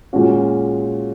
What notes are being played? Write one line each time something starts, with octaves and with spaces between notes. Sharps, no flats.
A#2 G#3 C#4 F#4